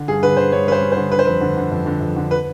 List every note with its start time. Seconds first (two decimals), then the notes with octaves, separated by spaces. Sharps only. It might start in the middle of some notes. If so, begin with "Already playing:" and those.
Already playing: D3
0.08 G2 G#4
0.23 D3 B4
0.37 D3 C5
0.52 G2 C#5
0.67 G2 B4
0.72 C5
0.81 G2
0.92 C5
0.96 D3
1.12 D3 B4
1.19 C5
1.25 F2 B4
1.41 D3
1.57 D3
1.71 F2
1.86 D3
2.01 F2
2.16 D3
2.31 B4